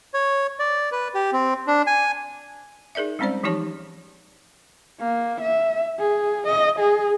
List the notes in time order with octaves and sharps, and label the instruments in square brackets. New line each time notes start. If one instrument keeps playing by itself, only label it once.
[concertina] C#5
D5
B4
G4
C4
D4
G#5
[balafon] D#4 G#4 A#4 D5 E5
G3 G#3 C4 C#4 C5 D5
E3 F3 D#4 G4 C#5 A5
[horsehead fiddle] A#3
E5
G#4
D#5
G#4